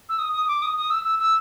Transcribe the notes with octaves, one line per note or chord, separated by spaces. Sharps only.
E6
D#6
D#6
D6
D#6
D#6
E6
E6
E6